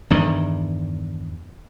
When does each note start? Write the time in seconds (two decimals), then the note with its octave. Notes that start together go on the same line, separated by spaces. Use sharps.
0.10 E2 G2 D#3